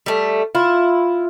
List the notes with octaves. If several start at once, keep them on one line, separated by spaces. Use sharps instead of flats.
G3 A3
E4 F4